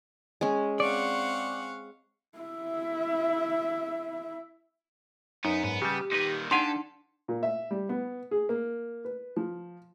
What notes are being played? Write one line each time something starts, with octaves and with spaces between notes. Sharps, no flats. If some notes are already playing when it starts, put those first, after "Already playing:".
G#3 C#4
C4 D5 F5 F#5 C#6
E4 E5
F#2 B3 D#4
G#2 B3
C#3 G3 G4
A#2 D#3 D#4 B4
D4 D#4 G4 A4 F5 F#5 G#5 C6
A#2
E5
G3
B3
G#4
A#3
B4
F3